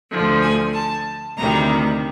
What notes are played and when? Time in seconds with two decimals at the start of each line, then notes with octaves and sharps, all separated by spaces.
0.10 D2 D3 F3
0.42 G#5
0.73 A5
1.36 D2 C3 D#3 G3 A#5